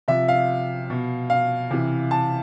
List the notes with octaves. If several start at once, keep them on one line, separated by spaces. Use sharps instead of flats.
C3 F3 E5
F5
B2
F5
C3 E3
A5